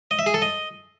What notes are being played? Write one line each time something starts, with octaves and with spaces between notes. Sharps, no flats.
D#5
E5
G#4
A4
D#5